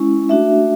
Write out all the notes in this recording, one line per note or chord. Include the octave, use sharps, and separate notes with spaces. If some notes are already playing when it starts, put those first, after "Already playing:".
Already playing: G#3 C#4 E4
A3 D4 F#4 E5